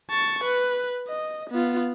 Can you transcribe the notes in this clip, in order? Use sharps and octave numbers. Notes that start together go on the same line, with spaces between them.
A5 C#6
B4
D#5
B3 F4